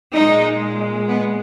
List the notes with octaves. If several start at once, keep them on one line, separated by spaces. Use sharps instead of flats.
A#2 G#3 D#4
B3